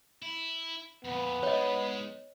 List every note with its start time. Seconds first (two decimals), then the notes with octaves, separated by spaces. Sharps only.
0.22 E4
1.05 F2 A#2 B3
1.43 G#3 D#4 C#5 D#5